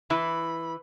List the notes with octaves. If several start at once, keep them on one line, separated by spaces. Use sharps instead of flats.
E3 E4 B5